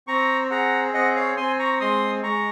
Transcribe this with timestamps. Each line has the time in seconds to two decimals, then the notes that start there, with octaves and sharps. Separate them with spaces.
0.07 C4 A#5 C#6
0.50 G#4 F#5 A#5
0.94 C4 D#5 F#5
1.16 C#5 F5
1.37 C4 G#5 C6
1.59 A#5 C#6
1.80 G#3 C6 D#6
2.23 G#3 A#5 C#6